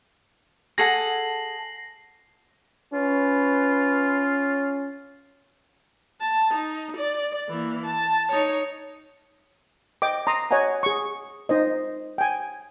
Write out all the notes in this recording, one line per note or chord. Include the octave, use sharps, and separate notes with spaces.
G#4 A4 F#5 A#6 C7 F#7
C#4 F4 B4
A5
D#4
D5
E3 A#3
A5
D#4 C#5
D#5 G5 D6
A#5 C6 D#6
C#5 D#5 F#5 G#5 A#5
G#4 C#6
D#4 C5 D#5
G5 G#5